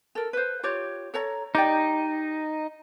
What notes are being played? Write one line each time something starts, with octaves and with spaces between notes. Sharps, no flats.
A4 A#4
B4 C5
F4 G4 C#5
A4 C#5 A#5
D#4 G4 D5 G5